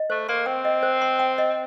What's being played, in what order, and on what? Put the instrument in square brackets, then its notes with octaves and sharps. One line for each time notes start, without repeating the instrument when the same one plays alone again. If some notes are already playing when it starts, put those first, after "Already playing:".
Already playing: [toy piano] D#5
[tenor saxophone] A3 [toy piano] C5
[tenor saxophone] A#3 [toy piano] C6
[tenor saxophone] C4 [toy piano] G5
[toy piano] D#5
C5
C6
G5
D#5